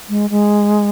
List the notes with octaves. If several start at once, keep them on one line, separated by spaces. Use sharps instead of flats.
G#3
G#3